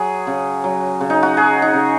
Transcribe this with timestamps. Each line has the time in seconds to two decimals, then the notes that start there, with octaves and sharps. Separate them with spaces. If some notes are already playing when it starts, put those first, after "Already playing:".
Already playing: F#3 G#4
0.27 C#3
0.64 F#3
1.01 C#3
1.10 D#4
1.23 F#4
1.37 F#3 G#4
1.62 D#4
1.74 C#3